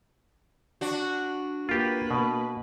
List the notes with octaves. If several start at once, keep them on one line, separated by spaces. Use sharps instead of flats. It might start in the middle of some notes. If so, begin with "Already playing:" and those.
D4 F#4
A#3 F4 G4 B4
B2